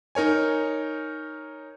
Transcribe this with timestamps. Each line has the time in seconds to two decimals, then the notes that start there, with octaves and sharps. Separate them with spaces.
0.15 D#4 A#4 C#5 G#5